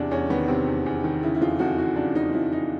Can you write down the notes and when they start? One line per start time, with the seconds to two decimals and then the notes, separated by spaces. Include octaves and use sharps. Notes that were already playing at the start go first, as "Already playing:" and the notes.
Already playing: E2 C3 D4
0.11 E2 C#4
0.30 D#3 B3
0.48 C3 C4
0.67 E2
0.86 E2
1.04 D#3
1.22 C#3 E4
1.35 E4
1.41 F2 F4
1.59 F2 F#4
1.78 E3 F#4
1.96 C#3 D4
2.15 F2 D#4
2.33 F2 E4
2.52 E3 D#4